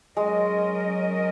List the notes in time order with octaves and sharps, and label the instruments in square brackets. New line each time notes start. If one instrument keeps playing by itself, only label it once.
[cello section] F#3 C#4 A#4 D#5 [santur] G#3